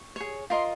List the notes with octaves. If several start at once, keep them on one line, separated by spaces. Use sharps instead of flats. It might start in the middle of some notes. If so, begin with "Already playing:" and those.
Already playing: C#6
G#4 C#5
F4 A#4 D#5 C6